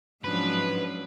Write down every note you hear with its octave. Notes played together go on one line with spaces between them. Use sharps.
G#2 F3 F#3 C#4 D4 B4